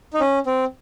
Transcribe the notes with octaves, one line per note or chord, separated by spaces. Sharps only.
D#4
C#4
C4